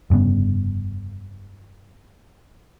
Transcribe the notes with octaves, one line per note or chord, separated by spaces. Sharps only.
F1 G2 C#3 B3